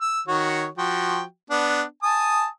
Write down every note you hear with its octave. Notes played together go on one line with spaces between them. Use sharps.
E6
D#3 F#4 C#5
F3 F#4 G5
B3 D4
G#5 A5 D#6